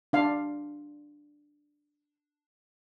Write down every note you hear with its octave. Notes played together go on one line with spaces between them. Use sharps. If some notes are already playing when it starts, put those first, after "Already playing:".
D4 F5